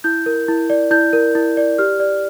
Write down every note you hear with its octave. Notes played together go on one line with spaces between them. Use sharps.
E4 G6
A#4
E4
D5
E4 G6
A#4
E4
D5
G4 F6
D5